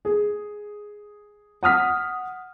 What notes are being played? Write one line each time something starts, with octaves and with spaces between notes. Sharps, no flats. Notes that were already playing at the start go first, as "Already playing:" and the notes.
G#4
F#5 D#6 F6 B6